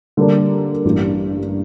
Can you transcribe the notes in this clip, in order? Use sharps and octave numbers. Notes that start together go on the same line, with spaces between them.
D3 G3 A#3 D4
A1 G2 E3 A#3